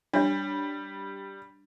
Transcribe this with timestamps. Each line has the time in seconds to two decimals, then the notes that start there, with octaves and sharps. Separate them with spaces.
0.13 G3 D4 C#5 E5